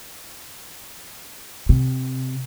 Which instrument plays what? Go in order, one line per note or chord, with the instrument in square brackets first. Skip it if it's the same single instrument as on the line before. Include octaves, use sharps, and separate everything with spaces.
[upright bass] C3